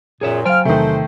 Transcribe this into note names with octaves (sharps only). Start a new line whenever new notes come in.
F#2 A#2 G#4 C#5 E5
F#3 C5 F5 G5 G#5 F6
E2 C3 D#3 A3 C4 A4 C5